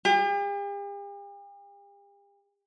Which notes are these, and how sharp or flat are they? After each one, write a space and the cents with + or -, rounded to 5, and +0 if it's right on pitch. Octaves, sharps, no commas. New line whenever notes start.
G4 +45